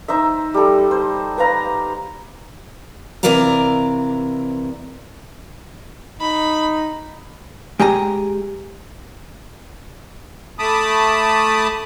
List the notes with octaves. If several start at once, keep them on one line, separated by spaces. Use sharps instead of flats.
D#4 C5 E5
G3 A4
C5
B4 C5 F5 A#5
C3 E3 A#4 D5 F5 A#5
D#4 B5
G#3 G4 G#5 A#5
A3 A5 B5 D6 D#6